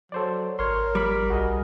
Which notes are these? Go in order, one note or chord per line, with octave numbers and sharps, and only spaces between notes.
F#3 A4 C5 D5
G#1 A#4 C#5 C6
G3 B5 D6
B1 F#4 G#4 D#5